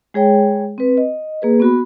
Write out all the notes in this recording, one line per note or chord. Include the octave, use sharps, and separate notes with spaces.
G#3 G#4 C#5 G5
C4 B4
D#5
A#3 G#4 B4
B3 F#4 B5